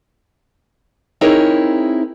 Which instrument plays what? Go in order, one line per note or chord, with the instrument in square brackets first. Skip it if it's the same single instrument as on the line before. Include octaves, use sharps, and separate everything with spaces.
[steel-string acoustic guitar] C4 D#4 E4 G#4 A#4 C#5